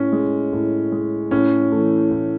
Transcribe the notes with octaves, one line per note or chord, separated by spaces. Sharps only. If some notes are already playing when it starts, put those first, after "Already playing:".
Already playing: A2 C#4
G#3
A2
G#3
A2 C#4
E3 A3
A2